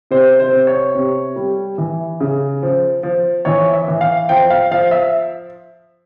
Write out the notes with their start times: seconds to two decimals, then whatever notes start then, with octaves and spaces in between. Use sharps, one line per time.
0.11 C3 C5
0.40 C5
0.53 C3
0.67 C#5
0.95 C3
1.36 G3
1.78 E3
2.20 C#3
2.63 F3
3.03 F3
3.45 E3 C#5
3.73 E5
3.88 E3
4.01 F5
4.29 F3 G5
4.50 F5
4.71 F3 F5
4.91 E5